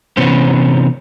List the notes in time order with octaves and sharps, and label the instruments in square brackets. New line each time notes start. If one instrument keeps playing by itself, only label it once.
[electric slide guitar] C3 E3 B3 C#4 C5